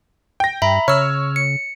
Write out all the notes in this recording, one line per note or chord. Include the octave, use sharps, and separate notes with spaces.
G5 A#6
G2 E5 A#5 B5
C#3 C#5 E6 F6
C#7